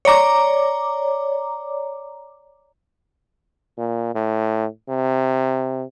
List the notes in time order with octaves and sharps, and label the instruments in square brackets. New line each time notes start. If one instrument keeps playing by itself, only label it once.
[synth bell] C#5 D5 A#5 D6
[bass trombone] A#2
A2
C3